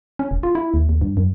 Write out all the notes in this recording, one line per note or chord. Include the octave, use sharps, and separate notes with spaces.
C#4
E1
F4
E4
D#2
D#2
G2
F#2